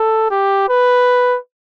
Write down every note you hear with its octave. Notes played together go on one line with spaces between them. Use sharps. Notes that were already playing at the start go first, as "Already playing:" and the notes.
Already playing: A4
G4
B4